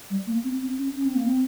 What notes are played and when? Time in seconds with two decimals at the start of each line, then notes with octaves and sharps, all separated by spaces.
0.10 G3
0.27 A#3
0.44 C4
0.62 C4
0.79 C#4
0.96 C#4
1.05 C4
1.15 A#3
1.26 C4